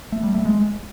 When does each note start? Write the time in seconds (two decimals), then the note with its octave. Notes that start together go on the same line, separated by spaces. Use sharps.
0.12 A3
0.23 G3
0.34 A3
0.45 G#3